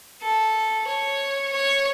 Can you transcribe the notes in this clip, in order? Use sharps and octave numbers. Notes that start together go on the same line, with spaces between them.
A4
C#5
C#5